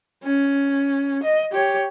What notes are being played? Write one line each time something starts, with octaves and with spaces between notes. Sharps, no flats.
C#4
D#5
G4 C#5